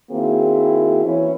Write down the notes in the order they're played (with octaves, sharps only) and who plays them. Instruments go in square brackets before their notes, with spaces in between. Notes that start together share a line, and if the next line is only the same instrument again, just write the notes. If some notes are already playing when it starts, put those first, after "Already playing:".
[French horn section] D#3 A#3 C4 E4 F#4 G#4
E3 C#4 E4